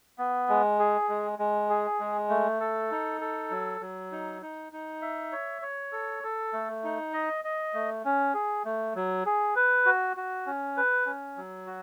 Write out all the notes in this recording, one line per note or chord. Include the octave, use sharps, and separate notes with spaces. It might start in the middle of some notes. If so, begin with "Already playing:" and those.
B3
G#3
G#4
G#3
G#3
G#4
G#3
A3
A4
D#4
A4
F#3
F#3
D#4
D#4
D#4
E5
C#5
C#5
A4
A4
A3
D#4
D#5
D#5
A3
C#4
G#4
A3
F#3
G#4
B4
F#4
F#4
C#4
B4
C#4
F#3
F#4